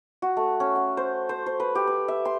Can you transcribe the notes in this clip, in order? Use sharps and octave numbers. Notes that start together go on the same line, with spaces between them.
F#4
A3
C#4
F#5
C5
C5
C5
B4
G4
B4
E5
C6